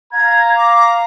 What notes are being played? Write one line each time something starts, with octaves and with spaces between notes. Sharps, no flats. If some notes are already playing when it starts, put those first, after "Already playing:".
F5 A#5 G#6
D6